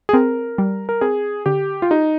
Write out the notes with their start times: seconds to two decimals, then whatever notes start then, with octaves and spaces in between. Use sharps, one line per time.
0.09 G#4
0.13 C4 A#4
0.58 G3
0.89 A#4
1.01 C4 G#4
1.46 D3 G4
1.82 F4
1.91 D#4 G4